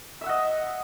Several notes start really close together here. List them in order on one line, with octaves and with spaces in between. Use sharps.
E5 E6 F#5 D#5